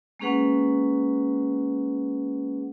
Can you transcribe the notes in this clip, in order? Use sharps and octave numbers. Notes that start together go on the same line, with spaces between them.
G#3 A#3 C#4 G#4 B4 F#5